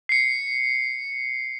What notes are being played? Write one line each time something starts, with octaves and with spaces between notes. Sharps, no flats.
C7 C#7